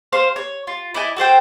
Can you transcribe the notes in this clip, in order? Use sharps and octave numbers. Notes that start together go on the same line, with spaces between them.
C5 F5 C6
C#5
F4
E4 D5 D#5 G#5
F#4 A4 C5 G5